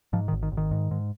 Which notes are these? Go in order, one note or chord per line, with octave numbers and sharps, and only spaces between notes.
G#2 F3
D#3
G#1
D#3
G#1
D#3
G#2
G#2